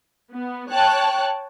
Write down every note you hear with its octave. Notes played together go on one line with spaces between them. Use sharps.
B3
C#5 G5 A5 F#6